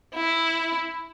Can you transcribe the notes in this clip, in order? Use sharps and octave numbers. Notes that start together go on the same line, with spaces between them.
E4